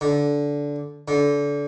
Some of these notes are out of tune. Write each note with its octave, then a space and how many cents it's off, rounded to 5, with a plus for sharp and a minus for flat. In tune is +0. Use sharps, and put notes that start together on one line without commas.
D3 -15
D3 -25